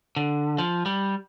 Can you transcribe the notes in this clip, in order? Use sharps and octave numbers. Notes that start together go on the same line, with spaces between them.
D3
F3
G3